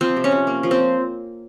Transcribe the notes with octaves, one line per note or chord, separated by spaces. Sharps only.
F3 C4
C3
C#4
C3
A#3
F3
C4